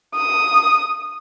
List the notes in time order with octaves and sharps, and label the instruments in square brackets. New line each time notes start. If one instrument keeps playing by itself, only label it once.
[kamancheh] D#6